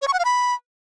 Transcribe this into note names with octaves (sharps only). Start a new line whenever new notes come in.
C#5
C#6
F#5
F5
B5